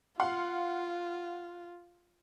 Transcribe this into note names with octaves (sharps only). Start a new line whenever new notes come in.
F4 F5 F#5 C6